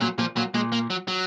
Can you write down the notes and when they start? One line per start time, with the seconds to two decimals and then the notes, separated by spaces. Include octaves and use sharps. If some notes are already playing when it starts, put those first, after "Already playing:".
0.01 A#2 F#3
0.19 A#2 F3
0.36 A#2 F#3
0.54 A#2 G#3
0.72 A#3
0.90 F#3
1.08 F#3